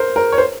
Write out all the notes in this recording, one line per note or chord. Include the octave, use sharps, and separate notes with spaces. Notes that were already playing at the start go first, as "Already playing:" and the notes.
Already playing: A#4 C5
A#4
C#5
C5